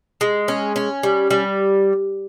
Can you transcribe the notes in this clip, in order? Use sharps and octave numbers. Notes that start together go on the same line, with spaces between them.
G#3
C#4
C#4
G3
G3